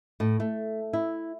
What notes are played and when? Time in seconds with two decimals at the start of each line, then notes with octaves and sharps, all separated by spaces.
0.20 A2
0.40 A3
0.93 E4